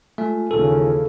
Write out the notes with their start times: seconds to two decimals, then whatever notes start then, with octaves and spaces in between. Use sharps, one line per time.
0.18 G#3 A3 F4
0.51 D#2 C#3 E3 A4